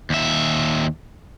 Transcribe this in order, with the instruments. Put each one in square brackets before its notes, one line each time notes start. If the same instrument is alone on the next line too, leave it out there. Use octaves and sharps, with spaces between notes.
[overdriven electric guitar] D#2 E5